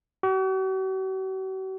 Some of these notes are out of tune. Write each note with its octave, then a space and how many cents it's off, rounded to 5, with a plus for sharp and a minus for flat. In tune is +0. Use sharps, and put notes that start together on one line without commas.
F#4 +45